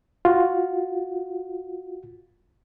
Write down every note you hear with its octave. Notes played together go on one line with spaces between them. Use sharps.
F4 F#4